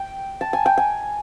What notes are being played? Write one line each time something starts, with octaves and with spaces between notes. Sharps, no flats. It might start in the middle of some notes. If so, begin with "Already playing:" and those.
Already playing: G5
A5
G#5
G5
G#5